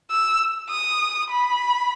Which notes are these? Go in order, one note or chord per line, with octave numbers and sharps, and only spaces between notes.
E6
D#6
B5